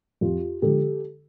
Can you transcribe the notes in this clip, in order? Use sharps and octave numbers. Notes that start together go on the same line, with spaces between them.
F2 F4 G4
D3 F3 G#3 G4 A4